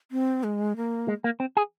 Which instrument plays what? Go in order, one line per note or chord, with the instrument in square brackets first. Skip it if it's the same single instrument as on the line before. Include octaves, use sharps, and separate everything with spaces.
[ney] C4
G#3
A#3
[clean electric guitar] G#3
A#3
C4
G#4